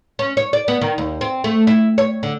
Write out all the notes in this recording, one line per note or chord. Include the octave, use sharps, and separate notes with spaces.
C#4
C#5
D5
B3
D#3
D#2
C4
A3
E4
C#5
D3